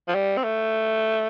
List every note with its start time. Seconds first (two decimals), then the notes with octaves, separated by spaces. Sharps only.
0.08 F3
0.14 G3
0.38 C4
0.44 A3